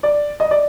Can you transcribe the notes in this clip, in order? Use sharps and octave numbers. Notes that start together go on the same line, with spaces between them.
D5
D#5
D5